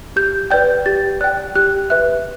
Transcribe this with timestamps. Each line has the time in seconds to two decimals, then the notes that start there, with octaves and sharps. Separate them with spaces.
0.16 G4 G6
0.51 B4 D5 G5 G6
0.86 G4 A6
1.21 D5 G5 F#6
1.55 G4 F#6
1.90 B4 E5 F#6